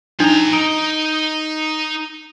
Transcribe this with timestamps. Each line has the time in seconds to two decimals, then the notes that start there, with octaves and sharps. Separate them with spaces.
0.20 F3 D4 D#4 A#5
0.53 D#4 D7